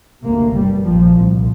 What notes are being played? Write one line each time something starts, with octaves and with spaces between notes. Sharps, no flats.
D2 C3 A#3
G1 G2 G3
A#1 A#2 F3
C2 A#2